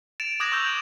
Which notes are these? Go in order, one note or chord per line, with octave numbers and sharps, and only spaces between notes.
A6 D7 E7 F7
D6 D#6 F#6 G#6 A#6 E7
C#6 E6 G6 F7